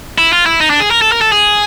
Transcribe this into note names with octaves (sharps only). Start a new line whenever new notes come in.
E4
F4
E4
D#4
D4
G#4
A#4
A4
A#4
A4
G#4